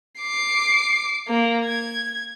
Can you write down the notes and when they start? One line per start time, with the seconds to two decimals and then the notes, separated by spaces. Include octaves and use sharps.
0.20 D6 C7
1.28 A#3
1.65 G#6